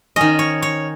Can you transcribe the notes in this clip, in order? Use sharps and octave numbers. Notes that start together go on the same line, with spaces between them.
D#3 C#4 D#5
C#5
C#5